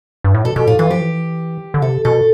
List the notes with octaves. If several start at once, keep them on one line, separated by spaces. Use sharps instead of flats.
G2
A2
B2 A4
B2 G4
A2 F4
E3 F4
F3 G4
E3
D3
C3 A4
B2 A4